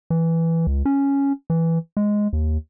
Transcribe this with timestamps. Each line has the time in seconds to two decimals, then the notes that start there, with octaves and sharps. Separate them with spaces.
0.10 E3
0.67 C#2
0.85 C#4
1.50 E3
1.97 G#3
2.33 D#2